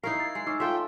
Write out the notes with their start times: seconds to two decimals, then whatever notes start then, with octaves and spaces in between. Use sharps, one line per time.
0.03 D#4 E4 A#4 F5 C#6 C7
0.20 G#6 A6
0.35 G#3 G#5 E6
0.47 C#4 D#4 D6 E6
0.60 F4 A4 E5 G5